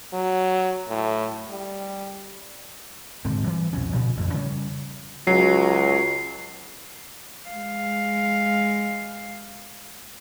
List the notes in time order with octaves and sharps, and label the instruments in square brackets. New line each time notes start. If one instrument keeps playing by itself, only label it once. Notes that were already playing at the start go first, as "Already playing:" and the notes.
[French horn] F#3
A2
G3
[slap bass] D#1 G#2 D3 C4
E3 G3
C2 F2 B2 C#4
A#2 C#3 F3
A1 F2
C#3 G3 C#4
[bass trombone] C#2 [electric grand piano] F#3 [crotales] C7
[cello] G#3 F5